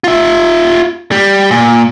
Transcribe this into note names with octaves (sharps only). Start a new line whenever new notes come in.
F4 E5
G3
A#2